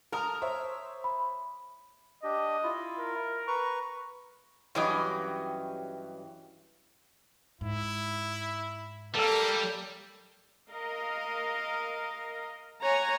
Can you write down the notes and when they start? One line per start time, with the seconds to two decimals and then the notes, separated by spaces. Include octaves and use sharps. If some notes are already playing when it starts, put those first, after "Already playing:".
0.12 A#4 A5 A#5 D#6
0.42 C5 C#5 E5
1.04 B5
2.24 D4 G4 D#5
2.63 E4 F4
2.99 A#4
3.48 B4 A#5 C#6
4.75 G2 E3 F#3 C#4 G4 D#5
7.61 G#2 E4
9.15 G3 A#3 A4 E6
10.70 A#4 D#5 F5
12.82 C#5 F#5 G#5 A#5